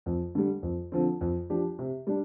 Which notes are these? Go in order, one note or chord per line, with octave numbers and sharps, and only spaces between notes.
F2
D3 G3
F2
D3 F3 C4
F2
F3 D4 G4
C3
G3 D4